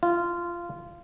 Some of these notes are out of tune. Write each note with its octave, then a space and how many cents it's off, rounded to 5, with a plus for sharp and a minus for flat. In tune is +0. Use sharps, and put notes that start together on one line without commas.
F4 -15